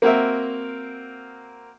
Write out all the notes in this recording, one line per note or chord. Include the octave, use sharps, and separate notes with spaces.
A#3 C4 F#4 A#4 E5